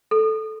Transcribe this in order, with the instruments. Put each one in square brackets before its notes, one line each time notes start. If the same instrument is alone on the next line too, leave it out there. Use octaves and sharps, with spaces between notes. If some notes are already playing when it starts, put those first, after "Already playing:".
[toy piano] A4